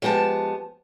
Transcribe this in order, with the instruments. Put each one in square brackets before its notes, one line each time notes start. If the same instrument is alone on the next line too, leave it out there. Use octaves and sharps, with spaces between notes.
[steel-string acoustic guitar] F3 G#3 B3 G4 A5